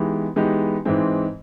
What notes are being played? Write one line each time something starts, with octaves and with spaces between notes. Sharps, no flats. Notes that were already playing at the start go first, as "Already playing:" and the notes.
Already playing: E3 G#3 B3 D#4 G4
E3 G#3 B3 D#4 G4
G#2 E3 G#3 C4